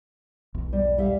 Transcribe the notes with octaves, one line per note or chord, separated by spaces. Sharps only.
B1 E2
G3
G3 E5 F5